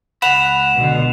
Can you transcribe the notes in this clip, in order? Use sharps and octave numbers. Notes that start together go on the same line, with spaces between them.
C#2 F#5 B5 E7 F7
B2 D3